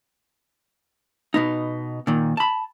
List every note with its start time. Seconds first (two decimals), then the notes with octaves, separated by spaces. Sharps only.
1.34 B2 B3 D#4
2.07 A#2 D#3
2.37 A5 B5